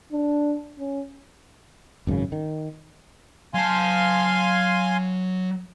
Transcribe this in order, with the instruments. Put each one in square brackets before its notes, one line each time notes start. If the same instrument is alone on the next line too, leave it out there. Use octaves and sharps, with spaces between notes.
[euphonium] D4
C#4
[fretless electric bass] G#1 F#2 A#2 C#3
D#3
[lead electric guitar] F#3 A5 [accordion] F5 G#5 C6